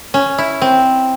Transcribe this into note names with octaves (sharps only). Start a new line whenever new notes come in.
C#4
E4
C4